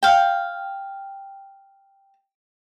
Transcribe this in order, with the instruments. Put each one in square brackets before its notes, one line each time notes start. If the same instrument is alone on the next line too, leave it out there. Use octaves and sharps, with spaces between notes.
[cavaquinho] F5 G5